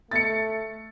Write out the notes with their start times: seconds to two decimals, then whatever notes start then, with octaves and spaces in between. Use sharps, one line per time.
0.11 A3 A6 C#7